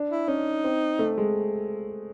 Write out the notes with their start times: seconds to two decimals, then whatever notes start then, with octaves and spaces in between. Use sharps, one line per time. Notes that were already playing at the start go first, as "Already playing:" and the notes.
Already playing: D4
0.10 E4
0.28 C#4 D#4
0.64 C4
0.99 A3
1.18 G#3